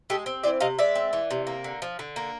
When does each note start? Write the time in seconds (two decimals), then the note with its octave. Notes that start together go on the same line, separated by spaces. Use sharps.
0.10 G#3 G4 A4
0.26 C4
0.43 E3 C5 D5
0.60 C3 D#5 F5
0.79 G#3 D5 E5
0.95 C4
1.13 E3
1.31 C3
1.47 A#3
1.64 D3
1.82 F3
1.99 D3
2.16 A#3